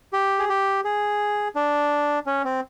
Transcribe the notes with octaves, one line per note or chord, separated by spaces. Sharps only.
G4
G#4
G4
G#4
D4
C#4
C4